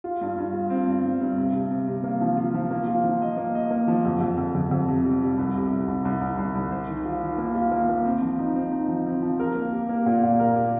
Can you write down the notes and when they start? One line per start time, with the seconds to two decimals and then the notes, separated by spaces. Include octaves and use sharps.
0.04 F4
0.21 G2
0.38 G2
0.53 F4
0.70 C4
0.87 G2
1.04 G2
1.21 G2
1.38 C3
1.54 C3
1.70 C3
1.88 C3
2.04 A#3
2.21 F3
2.37 F4
2.54 F3
2.70 A#3
2.88 F4
3.04 F3
3.22 D#5
3.37 A#3
3.55 D#5
3.71 A#3
3.88 F3
4.05 F2
4.21 F2
4.38 F2
4.55 F2
4.71 F2
4.88 C3
5.04 G3
5.22 G3
5.38 C2
5.56 C3
5.72 C2
5.88 C2
6.05 C2
6.21 C2
6.38 C2
6.55 C2
6.72 C5
6.89 D#3
7.05 F4
7.23 D#3
7.38 A#3
7.55 F4
7.71 A#3
7.89 A#3
8.05 C4
8.22 F3
8.39 D#4
8.55 C4
8.72 D#4
8.88 F3
9.06 C4
9.22 F3
9.40 A#4
9.55 A#3
9.72 G4
9.89 A#3
10.06 A#2
10.23 A#2
10.39 A#4
10.56 G4